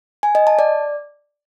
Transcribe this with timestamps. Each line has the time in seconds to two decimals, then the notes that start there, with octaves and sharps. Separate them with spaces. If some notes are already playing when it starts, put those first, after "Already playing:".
0.23 G#5
0.35 D#5
0.47 A5
0.59 D5